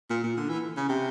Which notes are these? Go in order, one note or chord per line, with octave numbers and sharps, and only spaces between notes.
A#2
A#2
D3
E3
C#3
C3